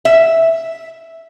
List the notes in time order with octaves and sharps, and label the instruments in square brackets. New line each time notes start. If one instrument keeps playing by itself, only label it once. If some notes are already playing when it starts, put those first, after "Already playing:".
[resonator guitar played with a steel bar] E5